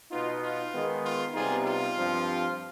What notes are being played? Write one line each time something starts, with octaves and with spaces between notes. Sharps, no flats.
B2 B3 D#4 F4
F4
D#3 G#3 B3
F4
C3 G3 B3 D#4 F4 G#4
F4
G2 F3 C4